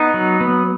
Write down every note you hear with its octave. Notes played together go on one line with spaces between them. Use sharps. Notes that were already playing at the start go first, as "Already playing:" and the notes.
Already playing: B3 D#4 D#5
F#3
B3